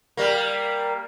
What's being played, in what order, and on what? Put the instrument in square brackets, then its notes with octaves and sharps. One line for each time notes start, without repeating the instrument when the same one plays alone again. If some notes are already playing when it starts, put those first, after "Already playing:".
[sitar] G3 A#3